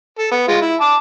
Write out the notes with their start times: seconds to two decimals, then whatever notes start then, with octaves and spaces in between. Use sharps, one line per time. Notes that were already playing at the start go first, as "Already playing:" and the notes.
0.19 A4
0.32 B3
0.48 G#3 F4
0.61 E4
0.81 A5 D6